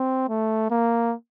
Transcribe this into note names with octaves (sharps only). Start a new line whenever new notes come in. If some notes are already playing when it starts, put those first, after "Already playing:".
Already playing: C4
A3
A#3